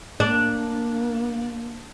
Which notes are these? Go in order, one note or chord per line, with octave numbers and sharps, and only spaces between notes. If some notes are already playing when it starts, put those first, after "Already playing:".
A#3 D4